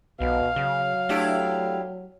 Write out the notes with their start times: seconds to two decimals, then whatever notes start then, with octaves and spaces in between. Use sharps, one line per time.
0.20 B1 B2 F5
0.56 C#3 F#3
1.09 A3 D4 E4 G4